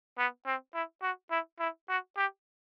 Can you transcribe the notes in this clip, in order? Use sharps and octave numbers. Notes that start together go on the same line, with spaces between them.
B3
C4
E4
F#4
E4
E4
F#4
G4